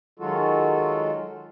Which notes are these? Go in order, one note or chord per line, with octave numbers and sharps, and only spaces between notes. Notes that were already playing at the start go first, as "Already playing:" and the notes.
D#3 F#3 G#3 F4 F#4 A4